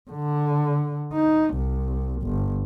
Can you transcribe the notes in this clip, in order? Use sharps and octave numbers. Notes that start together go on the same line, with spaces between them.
D3
D#4
C2
G1